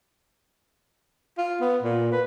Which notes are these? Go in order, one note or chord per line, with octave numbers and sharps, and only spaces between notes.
F4
B3
A#2
B4